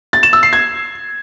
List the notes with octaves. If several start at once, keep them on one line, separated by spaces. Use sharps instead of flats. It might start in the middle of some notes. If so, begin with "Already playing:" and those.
A6
E7
E6
C7
G#6